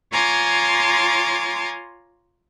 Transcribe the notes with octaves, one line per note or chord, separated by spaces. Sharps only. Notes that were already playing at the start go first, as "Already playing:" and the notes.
F4 C#5 G#5 A#5 C6 D6